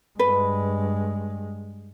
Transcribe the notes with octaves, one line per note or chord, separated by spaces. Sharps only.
G2 G#3 B4